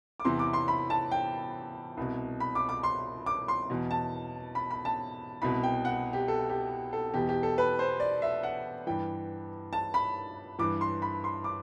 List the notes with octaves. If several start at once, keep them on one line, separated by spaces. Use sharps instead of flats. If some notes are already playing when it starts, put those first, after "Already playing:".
D6
E2 C3 E3 C6
D6
C6
B5
A5
G5
C2 B2
B5
D6
D6
C6
D6
C6
E2 B2
A5
B5
B5
A5
C2 B2 B5
G5
F#5
G4
A4
G4
A4
E2 B2 G4
G4
A4
B4
C5
D5
E5
F#5
G2 E3 G5
A5
B5
G2 E3 D6
C6
B5
C6
D6